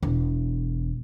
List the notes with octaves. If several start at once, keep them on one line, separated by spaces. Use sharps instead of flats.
E1